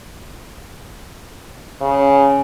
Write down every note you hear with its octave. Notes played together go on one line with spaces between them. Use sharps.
C#3